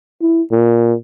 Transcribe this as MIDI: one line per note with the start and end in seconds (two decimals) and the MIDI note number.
0.21 0.42 64
0.51 0.94 46